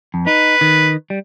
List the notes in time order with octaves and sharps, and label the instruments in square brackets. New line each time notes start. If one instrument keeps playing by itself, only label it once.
[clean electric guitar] F2
[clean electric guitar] D#4 [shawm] B4
[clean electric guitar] D#3
G3